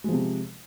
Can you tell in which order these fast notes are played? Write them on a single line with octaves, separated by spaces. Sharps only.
G#3 F3 C3